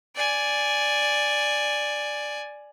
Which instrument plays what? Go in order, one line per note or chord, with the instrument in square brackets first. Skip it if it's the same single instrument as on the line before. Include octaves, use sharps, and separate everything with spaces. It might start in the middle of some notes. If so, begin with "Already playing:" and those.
[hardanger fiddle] D5 G#5